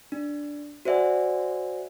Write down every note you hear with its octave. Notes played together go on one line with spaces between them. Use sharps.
D4
F#4 C5 D5 E5 F#5 G#5